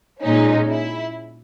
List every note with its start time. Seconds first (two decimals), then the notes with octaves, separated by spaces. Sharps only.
0.21 A#2 G#3 C#4 D#4
0.68 E4